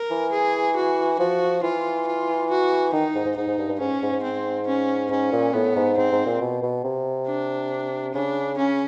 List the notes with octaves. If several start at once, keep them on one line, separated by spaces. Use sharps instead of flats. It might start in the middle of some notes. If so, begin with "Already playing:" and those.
Already playing: A#4
E3
G#4
F#4
F3 F#4
E3 F4
F4
F#4
D#3 D#4
G#2
G#2
G#2 D#4
G#2
G2
G2
G#2 C#4
G#2
G#2
C4
C#4
G#2 C#4
A#2
A2 B3
G#2
G#2 C4
G#2
A#2
B2
B2
C3
D4
C#3 D4
C#3 C#4